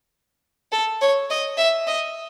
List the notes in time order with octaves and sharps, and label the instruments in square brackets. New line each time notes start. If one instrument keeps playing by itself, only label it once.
[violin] A4
C#5
D#5
E5
D#5